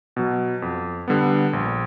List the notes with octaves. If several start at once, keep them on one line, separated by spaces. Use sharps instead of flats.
B2 F#3
F2
D3 G3 B3
A#1